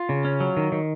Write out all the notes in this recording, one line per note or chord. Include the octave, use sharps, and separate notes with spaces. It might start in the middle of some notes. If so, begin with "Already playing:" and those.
Already playing: F4
C#3
C#4
F#3
D#3
D#3